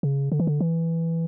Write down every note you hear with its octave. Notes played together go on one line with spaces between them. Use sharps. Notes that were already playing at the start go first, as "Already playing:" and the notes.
C#3
D3
E3
D3
E3